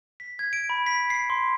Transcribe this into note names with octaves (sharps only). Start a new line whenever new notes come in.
B6
G#6
D7
B5
B6
C7
C6